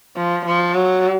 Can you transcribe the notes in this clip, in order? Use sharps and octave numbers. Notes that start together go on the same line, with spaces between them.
F3
F3
F#3